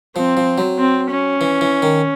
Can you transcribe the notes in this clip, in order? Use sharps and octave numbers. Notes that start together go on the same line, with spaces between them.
F3 C4
F3
F#3
C4
C#4
E3
E3
D#3